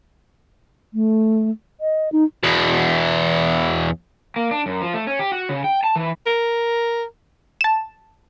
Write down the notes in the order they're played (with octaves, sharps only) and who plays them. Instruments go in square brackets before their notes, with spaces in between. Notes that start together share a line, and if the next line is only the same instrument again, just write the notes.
[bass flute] A3
D#5
D#4
[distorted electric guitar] E2 B2
[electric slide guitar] A#3
D4
F#2
F3
A3
C#4
G4
F#4
C#3
G5
A5
E3
[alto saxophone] A#4
[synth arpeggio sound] A5 E7